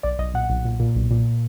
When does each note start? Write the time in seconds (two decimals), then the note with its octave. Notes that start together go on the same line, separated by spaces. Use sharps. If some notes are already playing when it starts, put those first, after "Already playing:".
0.03 B1 D5
0.19 B1 D#5
0.34 A#2 F#5
0.50 B1
0.65 A#2
0.80 A#2
0.95 B1
1.11 A#2